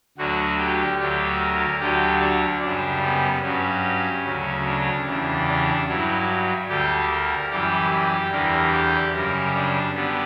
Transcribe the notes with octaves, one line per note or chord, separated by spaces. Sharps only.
D2 D3 F#3 F#4
G4
D2 D3 F#3 G4
A#4
D2 D3 F#3 G4
D4
F#2 C#3 G3 D4
B3
G2 F#3 C#4
D2 C#3 F#3
D4
E2 C#3 G3 D4
D4
G2 F#3 E4
D2 D3 G3 G4
A#4
F#2 E3 G3 G4
G4
E2 D3 G3 A#4
G4
F#2 C#3 G3 A#4
D4
D3 G3 B3